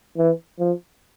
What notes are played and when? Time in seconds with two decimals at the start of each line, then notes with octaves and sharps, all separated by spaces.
0.18 E3
0.59 F3